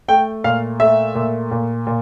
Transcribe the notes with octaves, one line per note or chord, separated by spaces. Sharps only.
A3 G5
A#2 F5
A3 E5
A#2
A#2
A#2